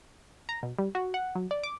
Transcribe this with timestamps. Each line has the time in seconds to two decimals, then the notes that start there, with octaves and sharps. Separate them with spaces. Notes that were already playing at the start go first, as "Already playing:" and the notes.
0.49 A#5
0.63 B2
0.79 G3
0.95 F#4
1.14 F#5
1.35 F#3
1.51 D5
1.63 D6